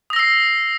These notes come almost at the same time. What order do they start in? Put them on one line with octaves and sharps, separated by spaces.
D#6 A#6 E6 C7